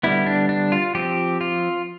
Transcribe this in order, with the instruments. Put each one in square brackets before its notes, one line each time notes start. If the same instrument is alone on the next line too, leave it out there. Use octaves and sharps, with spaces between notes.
[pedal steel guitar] D3 G3 B3 E4
D4
D4
F4
F3 C4 G4
F4